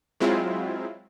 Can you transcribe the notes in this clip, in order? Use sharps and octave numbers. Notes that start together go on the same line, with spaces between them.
F#3 G#3 C4 E4 F4